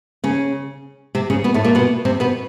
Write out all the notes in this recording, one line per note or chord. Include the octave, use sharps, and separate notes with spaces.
C#3 C#4
C3 C4
C#3 C#4
B2 B3
A2 A3
A#2 A#3
B2 B3
C3 C4
B2 B3